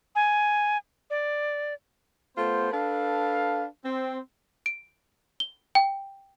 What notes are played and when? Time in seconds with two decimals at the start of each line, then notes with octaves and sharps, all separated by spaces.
0.15 G#5
1.10 D5
2.36 A3 B3 F4 C5
2.72 D4 A4 B4 F5
3.84 C4
4.66 D7
5.40 G7
5.75 G5